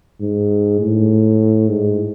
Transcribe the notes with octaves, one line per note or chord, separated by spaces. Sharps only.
G#2
A2
G#2